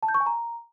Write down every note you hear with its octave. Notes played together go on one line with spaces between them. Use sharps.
A5
G6
C#6
G#5
A#5